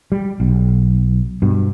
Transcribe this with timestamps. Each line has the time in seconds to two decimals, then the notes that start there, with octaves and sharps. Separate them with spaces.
0.12 G3
0.40 B1
1.42 G2 B2